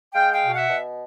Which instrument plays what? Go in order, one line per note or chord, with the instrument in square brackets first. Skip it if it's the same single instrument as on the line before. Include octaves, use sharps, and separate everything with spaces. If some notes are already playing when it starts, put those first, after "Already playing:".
[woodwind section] G#3 F5 G5
F5 G5
B2
E5 F#5
B2